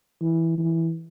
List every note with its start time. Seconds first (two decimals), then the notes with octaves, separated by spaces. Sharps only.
0.22 E3
0.58 E3